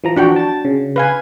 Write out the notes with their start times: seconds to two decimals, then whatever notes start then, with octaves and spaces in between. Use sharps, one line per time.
0.04 E3 F3 A#5
0.16 D4 F#4 G5
0.36 A5 A6
0.65 C#3
0.96 B4 F5 G#5